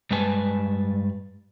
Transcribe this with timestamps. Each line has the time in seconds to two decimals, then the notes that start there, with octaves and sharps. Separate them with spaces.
0.11 G2 G3 G#3 B4 G#5 A5